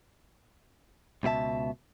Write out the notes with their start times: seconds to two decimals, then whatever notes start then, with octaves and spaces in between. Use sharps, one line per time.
1.23 C#2 B2 F4 E5 A5